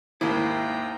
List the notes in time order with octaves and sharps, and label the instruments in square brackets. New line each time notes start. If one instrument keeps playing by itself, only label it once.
[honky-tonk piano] G#1 D#2 [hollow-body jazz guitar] A#3 E4 [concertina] G5 A#5